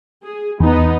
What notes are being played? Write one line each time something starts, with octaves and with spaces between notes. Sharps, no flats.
G#4
E2 B3 D#4